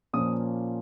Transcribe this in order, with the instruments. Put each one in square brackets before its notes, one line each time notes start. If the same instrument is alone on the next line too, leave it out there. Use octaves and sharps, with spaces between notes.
[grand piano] A#2 F3 A#3 C#4 D#6